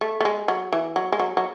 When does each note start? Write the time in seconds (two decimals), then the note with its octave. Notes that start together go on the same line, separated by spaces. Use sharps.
0.01 A3
0.20 A3
0.25 G#3
0.48 F#3
0.72 E3
0.96 F#3
1.12 G#3
1.19 F#3
1.37 F#3